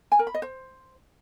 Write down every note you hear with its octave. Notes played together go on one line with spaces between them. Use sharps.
G#5
A#4
B5
D#5
C5